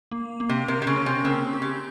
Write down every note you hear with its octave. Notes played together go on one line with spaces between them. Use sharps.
A#3
A#3
C3
C3 A#4
C3
C#3
C#4
C3
C#3 C4
G4
C#3